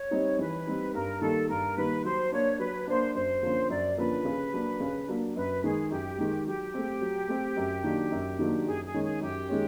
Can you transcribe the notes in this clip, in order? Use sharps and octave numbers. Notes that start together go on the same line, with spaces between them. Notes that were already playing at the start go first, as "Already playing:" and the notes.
Already playing: C#5
G3 C4 D#4
E3 B4
G3 C4 D#4
G2 A#4
D#3 G3 A#3 A4
G2 A#4
D#3 G3 A#3 B4
F#3 C5
A#3 D4 C#5
F#3 B4
A#3 D4 C5
F#2 C5
D3 F3 A#3 C#4
F#2 D5
D3 F3 A#3 C#4 B4
C#3
F#3 A#3 D4
C#3
F#3 A#3 D4
F#2 B4
D#3 G#3 G#4
F#2 G4
D#3 G#3
F#3 G4
A3 C4
F#3
A3 C4
F#2
D#3 F#3 A#3 D4
F#2
D#3 F#3 A#3 D4
F#2 G#4
G#4
D#3 G#3 C#4
G#4
F#2 G4
D#3 G#3 C#4